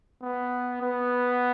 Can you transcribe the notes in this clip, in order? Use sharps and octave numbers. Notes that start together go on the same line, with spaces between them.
B3
B3